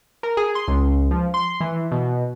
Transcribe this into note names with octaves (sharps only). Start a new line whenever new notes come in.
A#4
G#4
C6
C#2
F3
C6
E3
B2